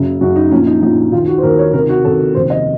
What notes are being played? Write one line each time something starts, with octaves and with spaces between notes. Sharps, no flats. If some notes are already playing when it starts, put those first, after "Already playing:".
Already playing: F#1 F#2 C#3
F#1 F#2 C#3 F#4
D#4
A#1 A#2 C#4
D#4
A#1 A#2 D#4
D#2 D#3 F4
F#4
C5
D#2 D#3 A#4
C#5
C#2 C3 D#3 A#4
F#4
C#2 C3 D#3 A4
F1 D#2 C#3 C5
D#5